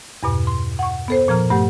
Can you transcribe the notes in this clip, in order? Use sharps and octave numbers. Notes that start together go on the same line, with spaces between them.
E2 G2 B2
C6
F#5 C#6
B3 A4 C5
A#2 F3 A#5 F6
G2 A3 G4 F#5